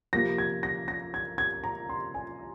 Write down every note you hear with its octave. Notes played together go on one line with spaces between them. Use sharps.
C3 F3 A#3 F4 A#6
G#6
A#6
A#6
G#6
G#6
A#5
C6
G#5